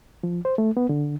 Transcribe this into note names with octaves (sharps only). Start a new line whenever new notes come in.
F3
C5
A3
B3
D3